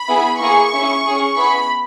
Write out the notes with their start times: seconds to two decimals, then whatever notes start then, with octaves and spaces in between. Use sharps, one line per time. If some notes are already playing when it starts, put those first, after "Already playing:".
Already playing: B5
0.08 B3 E4 G#4
0.41 A#3 E4 G#4 C#6
0.73 C#4 E4 G#4
1.05 C#4 G#4
1.37 B3 E4 G#4 B5